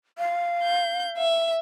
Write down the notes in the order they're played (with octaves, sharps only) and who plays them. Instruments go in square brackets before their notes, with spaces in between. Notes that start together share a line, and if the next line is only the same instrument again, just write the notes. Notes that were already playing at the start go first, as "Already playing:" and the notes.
[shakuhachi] F5
[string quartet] G6
E5